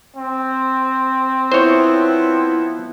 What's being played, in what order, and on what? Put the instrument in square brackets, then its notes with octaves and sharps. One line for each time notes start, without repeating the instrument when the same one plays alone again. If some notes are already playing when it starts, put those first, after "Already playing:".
[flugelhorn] C4
[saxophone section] F3 B3 E4 [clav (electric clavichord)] C5 C#5